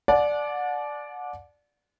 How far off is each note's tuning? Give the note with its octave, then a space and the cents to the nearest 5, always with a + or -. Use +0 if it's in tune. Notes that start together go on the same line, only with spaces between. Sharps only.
D5 +0 F#5 -30 A5 -40